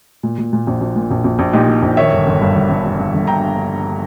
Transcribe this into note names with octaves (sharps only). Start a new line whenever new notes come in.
A#2
A#2
A#2
A#1
A#1
A#2
A#1
A#1
A#1
A#2 D#4 G4
A#2
A#1
D#3 C#5 E5
G1
G1
G2
G1
G1
G2
G2
G1
G5 A#5